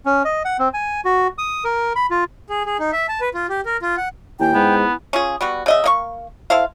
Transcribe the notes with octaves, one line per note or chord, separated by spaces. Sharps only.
C#4
D#5
F#5
C4
G#5
F#4
D#6
A#4
B5
F4
G#4
G#4
D#4
E5
A5
B4
F4
G4
A#4
F4
F#5
D#2 E4 G5 G#5
G#2 B3
C#4 F4 G#4
G3 B3 F#4
C#3 D#5 E5
A#3 D#5 C#6
E4 A4 C5 F5